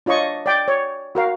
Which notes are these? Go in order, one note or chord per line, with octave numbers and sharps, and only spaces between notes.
D4 F4 C#5 D#5 C#6
D5 G5 D6
C#5
F#4 A#4 F5